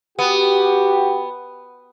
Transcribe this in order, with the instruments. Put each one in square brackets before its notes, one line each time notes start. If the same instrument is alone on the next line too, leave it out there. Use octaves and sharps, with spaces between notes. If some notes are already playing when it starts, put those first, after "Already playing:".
[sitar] B3 [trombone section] F#4 G4